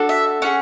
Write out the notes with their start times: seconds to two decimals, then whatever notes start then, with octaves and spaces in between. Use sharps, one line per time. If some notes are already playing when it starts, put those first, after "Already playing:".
Already playing: D4 F#4 A4
0.09 E5
0.42 C#4 F4 G#4 F#5